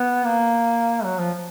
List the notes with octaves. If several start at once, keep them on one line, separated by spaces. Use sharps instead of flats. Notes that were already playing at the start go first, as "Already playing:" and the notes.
Already playing: B3
A#3
F#3
F3